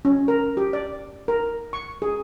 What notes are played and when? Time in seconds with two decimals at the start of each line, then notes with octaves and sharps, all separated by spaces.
0.05 C#4
0.28 A#4
0.57 G4
0.73 D5
1.28 A#4
1.73 C#6
2.02 G#4